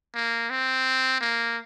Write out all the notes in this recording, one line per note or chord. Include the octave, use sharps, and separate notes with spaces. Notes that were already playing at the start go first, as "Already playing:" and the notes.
A#3
C4
A#3